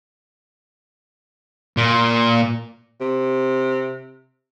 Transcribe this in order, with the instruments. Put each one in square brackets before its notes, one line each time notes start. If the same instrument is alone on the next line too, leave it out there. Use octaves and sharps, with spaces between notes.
[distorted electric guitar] A#2
[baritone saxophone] C3